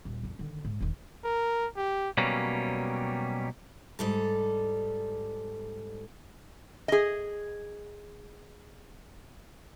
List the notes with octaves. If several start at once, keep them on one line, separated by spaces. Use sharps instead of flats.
D#1
F2 C#3
D3 D#3
G#2
E1 D#3
A#4
G4
B2 F#3 G3 A#3 C#4
G#2 G3 A4
G#4 D#5